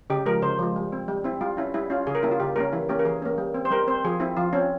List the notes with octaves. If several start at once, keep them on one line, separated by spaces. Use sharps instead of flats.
C#3 G4
F3 G#3 A#4
C#3 C5
F3 G#3
G3
C4
G3
C4 E4
G3 F4
C#4 E4
G3 E4
C#4 F4
C#3 G#4
A#4
G3 A#3 C#4 E4
F4
C#3 G4
G3 A#3 C#4 A#4
E3 E4
A#3 C#4 G4
A#4
E3 G#4
A#3 C#4
G3
C4
C5
G3 A#4
C4 C5
F3 G#4
C4 E4
F3 F4
C4 C#4